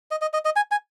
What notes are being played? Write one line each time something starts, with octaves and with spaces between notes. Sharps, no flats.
D#5
D#5
D#5
D#5
G#5
G#5